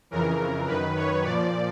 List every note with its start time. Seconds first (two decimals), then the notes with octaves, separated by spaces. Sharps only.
0.11 F2 C#3 E3 A#4
0.67 F#2 D#3 B4
0.96 C#5
1.24 A#2 F3 D5